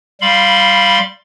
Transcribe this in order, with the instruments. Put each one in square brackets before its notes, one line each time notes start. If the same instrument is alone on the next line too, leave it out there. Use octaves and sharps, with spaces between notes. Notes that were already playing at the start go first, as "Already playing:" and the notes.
[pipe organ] G3 F5 B5 C6